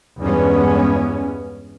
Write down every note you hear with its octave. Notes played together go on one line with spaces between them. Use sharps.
E2 G2 G#3 B3 C#4